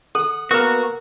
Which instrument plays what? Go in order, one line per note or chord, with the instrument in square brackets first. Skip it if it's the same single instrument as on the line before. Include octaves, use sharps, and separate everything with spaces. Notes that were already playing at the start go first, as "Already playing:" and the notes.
[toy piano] A4 [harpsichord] F#5 D#6
[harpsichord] A#3 F#5 [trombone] B3 [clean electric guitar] F#4 [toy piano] A#4 B4